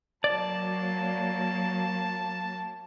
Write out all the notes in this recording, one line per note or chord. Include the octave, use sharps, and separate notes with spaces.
F#3 A#3 D5 A5